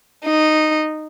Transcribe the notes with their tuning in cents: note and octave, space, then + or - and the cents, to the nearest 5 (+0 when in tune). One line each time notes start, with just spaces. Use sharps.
D#4 -10